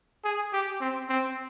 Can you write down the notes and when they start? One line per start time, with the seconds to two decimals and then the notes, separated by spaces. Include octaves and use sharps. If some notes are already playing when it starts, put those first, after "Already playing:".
0.24 G#4
0.53 G4
0.80 C4
1.09 C4